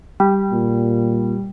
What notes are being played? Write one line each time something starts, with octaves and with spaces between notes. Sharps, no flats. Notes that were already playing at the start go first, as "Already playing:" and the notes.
G3
A#2